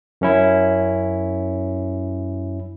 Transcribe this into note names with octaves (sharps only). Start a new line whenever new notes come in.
F#2 C#4 E4